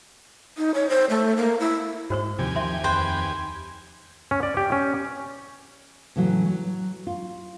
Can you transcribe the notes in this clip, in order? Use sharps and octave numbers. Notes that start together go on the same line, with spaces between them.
D#4
C#5
C5
A3
A#3
E4
G#2 F#4 C5 C#6
D#2 C3 F3 G4 G#5
F3 E5 C6
F2 B4 C5 G5
C#4
D5
G4
C#4
A2 C#3 E3 F#3
F#3
F4